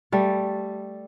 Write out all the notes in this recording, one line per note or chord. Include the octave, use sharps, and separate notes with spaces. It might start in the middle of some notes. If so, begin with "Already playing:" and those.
G3 A3